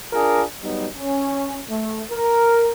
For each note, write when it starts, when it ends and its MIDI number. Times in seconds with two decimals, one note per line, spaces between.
0.13 0.42 62
0.13 0.42 65
0.13 0.42 68
0.13 0.42 70
0.62 0.87 54
0.62 0.87 55
0.62 0.87 59
0.62 0.87 63
0.95 1.59 61
1.69 2.02 57
2.11 2.72 70